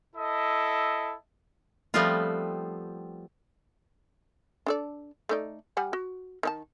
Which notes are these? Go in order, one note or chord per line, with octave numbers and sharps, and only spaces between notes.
E4 A4 D#5
F3 G3 A3 B3 C4 F4
D4 A4 D5
A3 D#4 D5
G3 F#5 G#5
F#4
D#3 D#4 A5